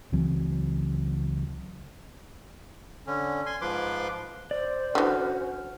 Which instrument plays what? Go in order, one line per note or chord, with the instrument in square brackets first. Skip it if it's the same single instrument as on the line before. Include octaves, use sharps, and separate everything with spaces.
[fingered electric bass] C#2 E3 F#3 C4
[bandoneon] D3 C#4
G#5 C6
G#2 F3 B4 C6 D6
[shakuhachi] C5 [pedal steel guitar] D5
[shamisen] D3 E3 [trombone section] C#4 F#4 [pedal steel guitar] F6